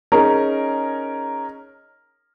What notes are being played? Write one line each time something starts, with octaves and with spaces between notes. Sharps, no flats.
C#4 D#4 G#4 A#4